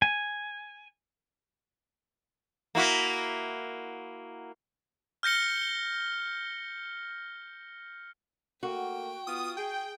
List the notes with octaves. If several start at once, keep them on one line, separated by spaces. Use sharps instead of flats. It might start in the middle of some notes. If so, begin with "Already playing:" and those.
G#5
A#3 E4 F#4
F6 G6 A#6 C#7 G7
A3 A#3 F#4 G5
B3 F4 D#6
G#4 G5